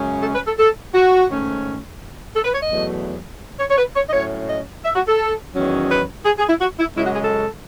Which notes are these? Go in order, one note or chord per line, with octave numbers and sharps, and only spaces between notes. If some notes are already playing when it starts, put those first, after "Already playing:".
Already playing: F#2 C#3 G#3 C#4
A4
B4
A4
A4
F#4
G#2 D#3 A3 C#4
A4
B4
C#5
D#5
E2 B2 F#3 A3
C#5
C#5
B4
C#5
D#5
A2 F#3 C#4 C#5
D#5
E5
F#4
A4
E2 D#3 F#3 C#4
B4
G#4
G#4
E4
F#4
E4
F#2 C#3 G#3 E4
F#4
G#4
A4